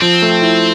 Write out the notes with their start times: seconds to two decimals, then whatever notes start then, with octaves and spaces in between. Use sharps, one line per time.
0.01 F3 C4
0.22 A3
0.42 E4